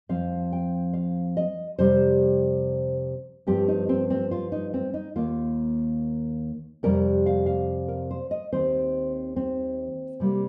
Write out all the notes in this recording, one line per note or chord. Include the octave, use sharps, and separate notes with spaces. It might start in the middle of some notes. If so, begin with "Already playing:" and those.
F2 F3 C4 F5
G5
F5
D#5
F2 C3 G3 C5
G2 F3 C4 G4
D#4
C4
C4
F4
D#4
C4
D#4
D#2 D#3 A#3 F4
F2 C3 G3 A#4
F5
F5
A#4
C5
D#5
D#2 D#3 C4 C5
C4
C3 G3 A#3